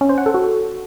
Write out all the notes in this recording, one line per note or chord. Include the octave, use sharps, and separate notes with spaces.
C#4
C5
F#5
A4
F#4